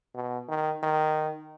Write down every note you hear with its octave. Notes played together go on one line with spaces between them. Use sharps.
B2
D#3
D#3